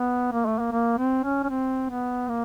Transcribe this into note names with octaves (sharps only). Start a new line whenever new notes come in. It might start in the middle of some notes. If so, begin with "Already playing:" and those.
Already playing: B3
A#3
A3
A#3
A#3
C4
C#4
C#4
C4
B3
A#3